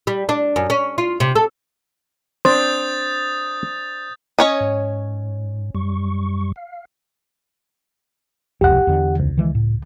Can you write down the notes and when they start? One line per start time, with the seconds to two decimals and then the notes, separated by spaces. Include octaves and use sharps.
0.07 G3
0.29 D4
0.56 F#2
0.70 C#4
0.98 F4
1.20 C3
1.35 A4
2.45 C4 D4 C5 D#6 G6 A6
4.39 C#4 C#5 D#5
4.60 G#2
5.75 F#2 G3 C#6
6.56 F5
8.61 E1 C2 F2 G4 F#5
8.87 E2 D3
9.19 C#2
9.38 D#3 E3 G#3
9.55 A2